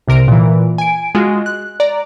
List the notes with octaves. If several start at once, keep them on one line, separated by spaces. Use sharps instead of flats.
C2 C3 A#4 D7
A#2 E3
G#5 D7
G#3 F4 F#4
F#6
D5 A#5